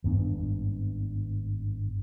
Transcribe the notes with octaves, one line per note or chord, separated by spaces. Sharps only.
G#1 G2 B3 D4